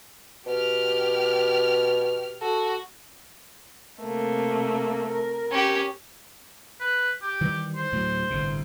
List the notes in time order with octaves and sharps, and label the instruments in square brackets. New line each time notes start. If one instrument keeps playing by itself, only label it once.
[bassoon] B2 [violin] G4 F6
[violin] F#4 [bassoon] A4
[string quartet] C3 A3 A#3
A#4
[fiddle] C#4 G4
[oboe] B4
G4
[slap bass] D#3 E3 G3
[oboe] C5
[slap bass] D2 A2 F#3
G1 A2 C3